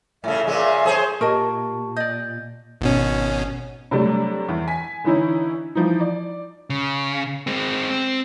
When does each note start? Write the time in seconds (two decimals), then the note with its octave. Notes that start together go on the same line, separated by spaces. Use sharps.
0.24 A2 C#3 E5
0.47 A#2 C#3 G#3
0.85 G#4 C5 C#5
1.21 A#2 G4 A#4 D#5 A5 C#6
1.97 D5 D#5 G6
2.81 G#1 B2 C#4
3.91 C3 F#3 G3 A3 D4
4.48 E2
4.68 G#5 B6
5.04 D3 E3 C#4 D#4 E4
5.75 E3 F3 D#4
6.00 D5
6.70 C#3
7.47 G#3 C4
7.90 C4